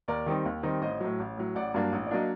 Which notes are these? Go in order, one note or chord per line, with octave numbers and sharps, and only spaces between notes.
D#2 A#4 D5
D#3 G3 C4 D#4
D#2
D#3 G3 C4 D#4
A1 C5 D#5
A2 F#3
A1
A2 F#3
A1 D5 F#5
G2 F#3 A#3 D4
A1
D5
F#3 A#3 D4 D#5